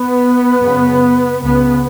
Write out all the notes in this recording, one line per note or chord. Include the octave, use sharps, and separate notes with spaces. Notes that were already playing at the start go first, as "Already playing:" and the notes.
Already playing: B3
F#2 C#3
C#2 C#3 B3